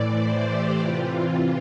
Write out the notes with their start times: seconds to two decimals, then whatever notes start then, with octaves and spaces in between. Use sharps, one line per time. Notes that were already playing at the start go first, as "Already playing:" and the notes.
Already playing: A2 E3 D5
0.09 C5
0.43 G4
0.79 C3 E3 F4